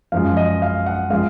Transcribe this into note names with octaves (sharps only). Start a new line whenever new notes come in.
F#2 F3 G#3 F5
D#5
F5
F#5
F3 G#3 F5